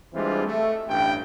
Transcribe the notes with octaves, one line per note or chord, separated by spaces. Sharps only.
E3 G3 G#3 C4 D4 F4
A3
A1 G2 G5